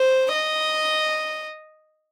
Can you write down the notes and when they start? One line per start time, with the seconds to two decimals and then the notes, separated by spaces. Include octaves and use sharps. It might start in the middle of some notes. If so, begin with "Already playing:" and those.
Already playing: C5
0.34 D#5